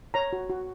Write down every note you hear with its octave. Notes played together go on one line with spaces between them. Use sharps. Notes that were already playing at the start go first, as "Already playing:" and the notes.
C#5 A#5
F#4
F#4